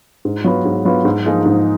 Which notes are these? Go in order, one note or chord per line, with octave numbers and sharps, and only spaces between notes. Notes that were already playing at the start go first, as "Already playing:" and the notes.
G#2
F#3 B3 F4 B4
G#2
F#3 B3 F4 B4
G#2
F3 A#3 D#4 G#4
G#2